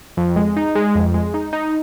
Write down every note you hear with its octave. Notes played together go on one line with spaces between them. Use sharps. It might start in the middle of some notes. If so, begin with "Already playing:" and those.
F2
G#3
D#4
G#3
F2
G#3
D#4
D#4